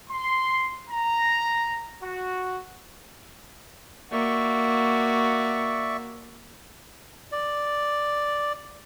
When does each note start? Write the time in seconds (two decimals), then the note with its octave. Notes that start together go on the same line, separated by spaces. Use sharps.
0.11 C6
0.90 A#5
2.03 F#4
4.12 A#3 F#4 D5 E5 C#6
7.32 D5